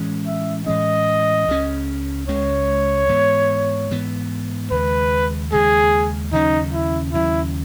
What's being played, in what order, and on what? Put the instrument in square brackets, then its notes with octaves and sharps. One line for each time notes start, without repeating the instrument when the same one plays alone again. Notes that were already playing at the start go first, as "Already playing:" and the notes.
Already playing: [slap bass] A2 E3 G#3 C#4
[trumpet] E5
[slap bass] A2 E3 G#3 C#4 [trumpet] D#5
[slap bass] C#2 C#3 G#3 C#4
[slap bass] C#2 C#3 G#3 C#4 [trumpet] C#5
[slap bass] G#2 E3 B3
G#2 E3 B3
[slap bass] D#2 C#3 G#3 [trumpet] B4
[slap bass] D#2 C#3 G#3 [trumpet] G#4
[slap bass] D#2 C#3 F#3 C#4 [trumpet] D#4
[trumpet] E4
[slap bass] D#2 C#3 F#3 C#4 [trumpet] E4